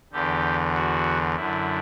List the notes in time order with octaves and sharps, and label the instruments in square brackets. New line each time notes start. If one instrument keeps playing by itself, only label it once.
[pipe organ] E2 D3 G4
F#4
F#2 D3 E4